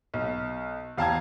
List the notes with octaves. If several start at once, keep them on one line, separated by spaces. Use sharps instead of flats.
B1
E2 F5 G5 A5 A#5 G#6